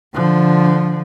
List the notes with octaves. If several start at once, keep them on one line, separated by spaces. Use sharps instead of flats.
D3 F3